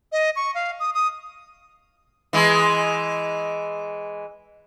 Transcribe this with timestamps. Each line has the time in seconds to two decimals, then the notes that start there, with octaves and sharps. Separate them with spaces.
0.12 D#5
0.36 C#6
0.55 F5
0.80 D#6
0.94 D#6
2.33 E3 G#3